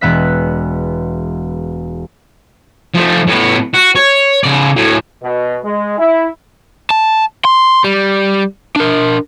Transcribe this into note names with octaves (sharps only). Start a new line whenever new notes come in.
E1 G#3 B3 E5 F#6 B6
F3 A3
A2 B3
F#4
C#5
C#3 D5
A2 F#3
B2
G#3
E4
A5
C6
G3
D4 A#4